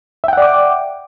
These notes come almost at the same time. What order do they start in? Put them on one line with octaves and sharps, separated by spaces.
E5 G5 F#5 D5 D6